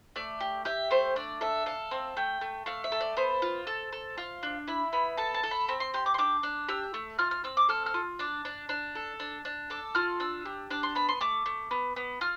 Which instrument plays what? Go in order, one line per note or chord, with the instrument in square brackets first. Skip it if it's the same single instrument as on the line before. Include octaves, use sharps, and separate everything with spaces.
[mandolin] A3 D5
G4
G4 E5
A3 C5
D4 D5
A4 E5
A4 F5
C4
A3 G5
A3
A3 F5
E5
A4
D5
B3 C5
F4
A4
A4
F4
D4
E4 B5
B3 B5
A4 A5
A5
A4
B5
C4 B5
C6
G4 C6
D6
C6
D4 D6
D4
G4 E6
A3
F4 F6
F6
C4 E6
D6
A4 F6
F6
F4
D4 D6
D4
D4
A4
D4
D4
A4 D6
F4 F6
D4 E6
G4
D4 D6
C6
B3 B5
C6
A3 D6
A3
B3
B3
F4 F6